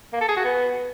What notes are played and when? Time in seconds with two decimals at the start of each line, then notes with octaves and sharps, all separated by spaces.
0.13 A#3
0.21 A4
0.29 G#4
0.37 F#4
0.44 B3